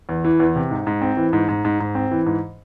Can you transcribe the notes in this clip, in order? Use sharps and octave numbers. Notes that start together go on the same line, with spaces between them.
E2
E3
E2
C3
G#2
G#2
C4
E3
G#2
G#2
G#2
G#2
C4
E3
G#2